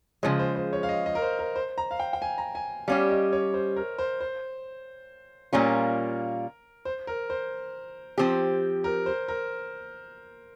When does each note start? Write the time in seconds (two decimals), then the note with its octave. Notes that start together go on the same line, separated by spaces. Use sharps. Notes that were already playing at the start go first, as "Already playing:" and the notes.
0.23 C#3 F3 G#3 C#5
0.39 C5
0.56 C5
0.73 C#5
0.83 F5
0.89 D#5
1.06 D#5
1.15 A#4
1.22 C5
1.39 A#4
1.56 C5
1.78 A#5
1.91 F5
2.00 G5
2.13 G5
2.22 G#5
2.38 A#5
2.55 G#5
2.88 G3 C#4 G4 F5
3.10 D#5
3.33 C#5
3.54 C5
3.76 A#4
3.99 C5
4.21 C5
5.53 A#2 G3 A#3 C#4 F4 A#4
6.85 C5
7.07 A#4
7.30 C5
8.18 F3 C4 G4
8.84 A#4
9.06 C5
9.28 A#4